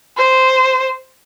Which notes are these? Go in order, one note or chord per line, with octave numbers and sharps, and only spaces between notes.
C5